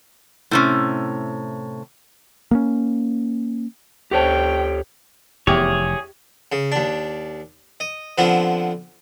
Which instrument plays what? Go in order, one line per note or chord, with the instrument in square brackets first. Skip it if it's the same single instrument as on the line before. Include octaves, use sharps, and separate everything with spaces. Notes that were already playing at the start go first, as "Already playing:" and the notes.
[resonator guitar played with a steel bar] A2 C3 C#4
[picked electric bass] A#3 B3 C#4
[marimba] D2 C5 A5 [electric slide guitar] G4 A4 C#5 [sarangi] G5
[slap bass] F1 [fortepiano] E2 [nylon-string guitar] G4 [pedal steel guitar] G#4 C#5
[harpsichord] C#3
D#2 D4
D#5
D3 F3 B3 C4